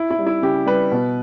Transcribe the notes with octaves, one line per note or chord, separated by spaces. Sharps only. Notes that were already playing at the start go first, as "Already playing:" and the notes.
Already playing: E4
E4
G3
E4
C#3 G4
G3 B4
B2